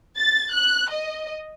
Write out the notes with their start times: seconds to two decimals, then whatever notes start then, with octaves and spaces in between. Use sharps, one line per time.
0.17 A6
0.52 F#6
0.90 D#5